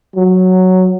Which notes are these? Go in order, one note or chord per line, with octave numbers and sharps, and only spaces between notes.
F#3